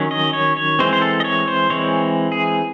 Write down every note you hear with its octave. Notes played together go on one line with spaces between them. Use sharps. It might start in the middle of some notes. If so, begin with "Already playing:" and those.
Already playing: D#3 F#3 C#4
D#5
C#5
C#5
E3 G#3 C4 C5
C5
A4
D#5
C#5
C5
E3 G#3 C4 C#5
G#4